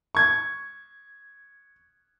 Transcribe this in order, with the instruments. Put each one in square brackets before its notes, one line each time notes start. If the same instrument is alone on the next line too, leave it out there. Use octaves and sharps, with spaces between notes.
[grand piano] C#6 G#6